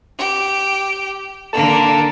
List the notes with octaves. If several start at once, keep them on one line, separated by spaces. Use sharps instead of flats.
G4
D3 A#3 A4 A5